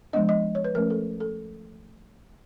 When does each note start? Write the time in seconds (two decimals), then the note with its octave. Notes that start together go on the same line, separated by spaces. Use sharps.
0.13 F3 G#3 B3 D4 D#5
0.29 D#5
0.55 C#5
0.64 B4
0.74 F3 A3 C#4 A#4
0.90 A4
1.20 A4